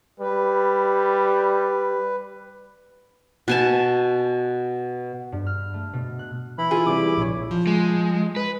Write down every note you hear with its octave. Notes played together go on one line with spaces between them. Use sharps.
G3 B4
B2 G#5 A5
G2
F6
A3
B2
F#6
E3 E4 B5
F4 G#4
C3 E3 G3 D6
A#1 C#5
F3
G#3
B4